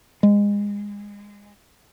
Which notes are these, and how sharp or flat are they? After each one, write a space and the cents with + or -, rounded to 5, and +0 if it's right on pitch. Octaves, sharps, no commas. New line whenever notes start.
G#3 -25